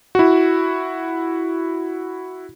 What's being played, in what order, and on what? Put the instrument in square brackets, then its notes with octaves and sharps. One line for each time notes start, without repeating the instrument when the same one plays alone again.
[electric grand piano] E4 F#4